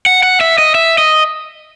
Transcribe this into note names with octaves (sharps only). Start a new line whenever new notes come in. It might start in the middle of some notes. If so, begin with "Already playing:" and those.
F#5
F#5
E5
D#5
E5
D#5